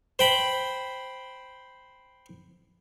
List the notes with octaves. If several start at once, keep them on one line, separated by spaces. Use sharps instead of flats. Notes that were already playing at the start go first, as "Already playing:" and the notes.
C5 G5 B5